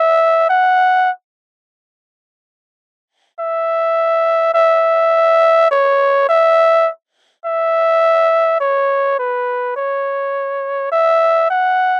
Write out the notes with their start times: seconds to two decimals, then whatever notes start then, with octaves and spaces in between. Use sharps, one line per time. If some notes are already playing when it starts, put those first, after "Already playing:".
Already playing: E5
0.49 F#5
3.40 E5
4.54 E5
5.71 C#5
6.29 E5
7.45 E5
8.60 C#5
9.19 B4
9.76 C#5
10.92 E5
11.50 F#5